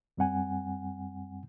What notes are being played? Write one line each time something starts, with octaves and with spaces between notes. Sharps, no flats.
F#2 G3 C4 F#5 G#5